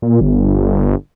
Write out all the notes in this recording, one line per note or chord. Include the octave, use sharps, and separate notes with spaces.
A#2
G1